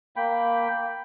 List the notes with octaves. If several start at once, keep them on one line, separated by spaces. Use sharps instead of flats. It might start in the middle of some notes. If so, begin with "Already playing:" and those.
A#3 G5 B5